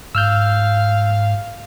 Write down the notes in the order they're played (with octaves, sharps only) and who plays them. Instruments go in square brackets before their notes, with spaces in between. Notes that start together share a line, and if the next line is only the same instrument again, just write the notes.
[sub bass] G#2 [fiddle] F5 [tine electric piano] E6 F6 G6